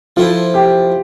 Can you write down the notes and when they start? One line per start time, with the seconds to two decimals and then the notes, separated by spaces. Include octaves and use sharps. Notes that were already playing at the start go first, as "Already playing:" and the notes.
0.16 F3 A3 C4 E4 F4
0.54 G4